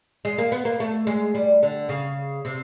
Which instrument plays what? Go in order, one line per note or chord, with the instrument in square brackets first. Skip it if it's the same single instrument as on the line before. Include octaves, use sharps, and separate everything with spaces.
[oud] G#3
A#3
B3
A#3
A3
G#3
G3
D3
C#3
C3